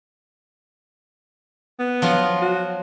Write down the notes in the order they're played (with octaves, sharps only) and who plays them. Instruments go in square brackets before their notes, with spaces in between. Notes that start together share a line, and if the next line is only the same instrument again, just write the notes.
[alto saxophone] B3
[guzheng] F3 F#3 F4
[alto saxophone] F#4